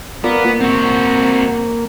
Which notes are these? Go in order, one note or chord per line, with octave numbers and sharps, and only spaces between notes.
B3 F4 A#4 D5
A#3
C4 F#4